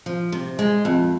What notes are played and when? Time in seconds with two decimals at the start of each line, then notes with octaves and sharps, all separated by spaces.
0.06 F3
0.32 C3
0.59 G#3
0.85 F2